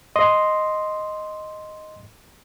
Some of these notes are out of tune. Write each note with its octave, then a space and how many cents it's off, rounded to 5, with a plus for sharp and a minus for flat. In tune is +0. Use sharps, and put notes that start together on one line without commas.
D#5 +0 C6 +0